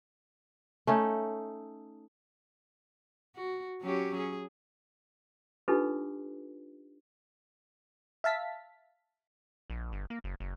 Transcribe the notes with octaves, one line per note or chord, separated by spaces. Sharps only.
A3 C#4 D#4
F#4
F#3 C#4 G4
G#4
D4 D#4 F4 G4 A4 B4
E5 F5 A5 B6
A#1
G1
A#3
F#1
F#1